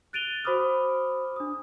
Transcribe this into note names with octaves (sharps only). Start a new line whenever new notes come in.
F#6 A6 D7 D#7 F7 G7
F#4 C5 B5 D6 D#6 F6
D4 D#6